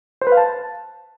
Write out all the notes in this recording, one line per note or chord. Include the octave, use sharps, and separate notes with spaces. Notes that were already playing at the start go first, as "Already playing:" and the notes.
C5
B4
F5
A5